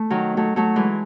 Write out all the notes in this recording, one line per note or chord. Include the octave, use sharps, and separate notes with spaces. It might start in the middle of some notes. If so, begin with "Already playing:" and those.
Already playing: A3
D#3 F#3
F#3 A3
F#3 A3
E3 G#3